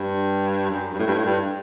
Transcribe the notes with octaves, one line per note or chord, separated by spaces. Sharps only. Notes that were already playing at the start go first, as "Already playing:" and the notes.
Already playing: G2
F#2
G2
A2
G2
A2
G2